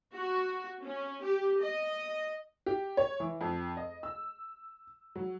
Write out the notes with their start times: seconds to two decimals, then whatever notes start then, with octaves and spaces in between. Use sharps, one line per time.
0.15 F#4
0.83 C#4
1.22 G4
1.61 D#5
2.66 G4
2.97 C#5
3.20 E3
3.41 F2
3.77 D#5
4.03 E6
5.16 F#3